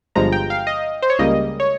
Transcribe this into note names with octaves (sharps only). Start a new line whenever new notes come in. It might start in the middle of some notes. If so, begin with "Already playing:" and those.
G1 G2 F3 G#3 A#5
G5
F5
D#5
C5
C#5
C#2 C#3 G3 A#3 D#5
C#5